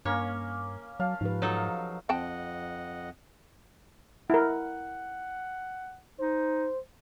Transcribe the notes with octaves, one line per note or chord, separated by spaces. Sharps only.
G2 A#3 C#4 C#5
F#3 F5 A5
G#2 F3 G4 B4
F#3 D#4 A4
F5 A#5
F2 C4 D#5 F#5 G5 A5
E4 A#4 F#5
D#4 C5